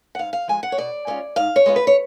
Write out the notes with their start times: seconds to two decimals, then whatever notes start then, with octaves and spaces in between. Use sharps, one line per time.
0.15 F#5
0.18 G#2 F5
0.33 F5
0.48 F3 G#3 G#5
0.63 F#5
0.72 C#5
0.78 B2 D5
1.07 G#3 C#4 F4
1.36 G#2 F5
1.56 C#5
1.66 G#3 B3 F4
1.76 B4
1.87 C#5